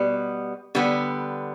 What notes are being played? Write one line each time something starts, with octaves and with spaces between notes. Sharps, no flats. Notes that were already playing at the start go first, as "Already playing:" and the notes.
Already playing: B2 G3 B3
D3 G3 B3